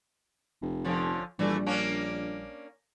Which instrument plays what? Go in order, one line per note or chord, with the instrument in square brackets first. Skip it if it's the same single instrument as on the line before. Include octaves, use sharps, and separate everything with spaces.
[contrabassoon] F1
[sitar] D3 F3 C#4
[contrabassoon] A#1 [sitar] E3 A3 [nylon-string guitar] G3 D5
[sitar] A#3 C#4 D4